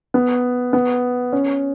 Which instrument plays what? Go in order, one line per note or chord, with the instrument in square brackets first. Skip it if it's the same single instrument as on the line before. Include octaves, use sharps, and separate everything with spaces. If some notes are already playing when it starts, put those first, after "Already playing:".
[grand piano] B3
B3
C#4